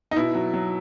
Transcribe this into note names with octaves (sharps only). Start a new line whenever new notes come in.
D#4
B2 E4
F#3
F#3